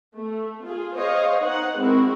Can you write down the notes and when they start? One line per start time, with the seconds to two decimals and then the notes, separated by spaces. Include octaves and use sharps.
0.17 A3
0.64 F4 G#4
0.98 G#4 C5 C#5 D#5 F5
1.43 D#4 C5 F#5
1.78 G#3 C4 E4 F#4 A#4